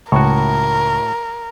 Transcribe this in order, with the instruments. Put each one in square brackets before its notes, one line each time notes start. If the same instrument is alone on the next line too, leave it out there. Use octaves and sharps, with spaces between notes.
[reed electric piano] C#2 C#6 [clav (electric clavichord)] A2 F#4 [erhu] A#4